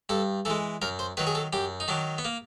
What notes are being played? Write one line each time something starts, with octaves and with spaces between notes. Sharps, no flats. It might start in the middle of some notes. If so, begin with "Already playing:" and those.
G2 A4
E3 G#3 A4
F#2 A#4
C5
D#3 F#3 B4
G#4
A4
F#2 G4
D#4
D#3 F#3 D4
B3
A#3